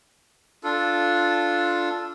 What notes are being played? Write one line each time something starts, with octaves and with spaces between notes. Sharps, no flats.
D4 F4 A4